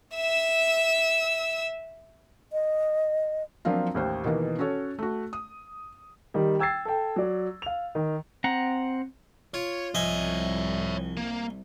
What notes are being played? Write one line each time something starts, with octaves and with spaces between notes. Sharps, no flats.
E5 E6
D#5
F3 F#3 A#3 C4 D4 F4
A1 D#2 C5
B2 D#3 E3 A#3 B3
C#4 F#4 A4 C#5
A3 F#4
D#6
D#3 G3
G5 E6 G#6 A6 C7
A4 G5
F#3 D5
F5 F7
D#3
C4 F#5 A#5
F4 C#5
C2 F3 C#5 D#5 E5 G#5
A#3